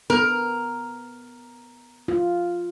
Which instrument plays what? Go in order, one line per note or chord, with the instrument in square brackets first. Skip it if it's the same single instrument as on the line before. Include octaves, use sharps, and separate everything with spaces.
[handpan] B3 [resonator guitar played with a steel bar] A#4
[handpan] F4